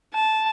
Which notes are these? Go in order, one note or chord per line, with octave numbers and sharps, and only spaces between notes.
A5